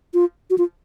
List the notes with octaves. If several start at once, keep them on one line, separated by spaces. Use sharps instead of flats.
F4
F#4
F4